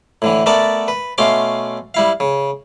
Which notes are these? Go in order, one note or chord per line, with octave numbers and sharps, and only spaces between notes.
A2 D3 E3
A3 B3 A#4 D5 F#5 A5
B4
B2 A3 C#4 F5 C6 D6
G3 E4 F5
C#3